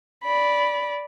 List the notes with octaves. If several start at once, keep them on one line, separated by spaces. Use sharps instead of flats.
D5 B5